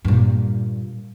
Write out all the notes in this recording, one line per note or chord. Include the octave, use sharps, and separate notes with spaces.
G2 A#2